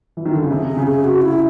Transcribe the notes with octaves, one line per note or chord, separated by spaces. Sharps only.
E3
D#3
D3
C#3
C3 G#4
G#4
C#3
G#4
F#4
E4